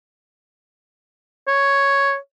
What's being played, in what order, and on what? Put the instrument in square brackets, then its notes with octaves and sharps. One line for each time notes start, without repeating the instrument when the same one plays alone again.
[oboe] C#5